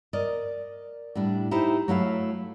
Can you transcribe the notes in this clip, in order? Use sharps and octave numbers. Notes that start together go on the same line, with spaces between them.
A#4 D5 D#5
A2 G3 D4
D#4 E4 G4 C5
F#3 A3 E4 F5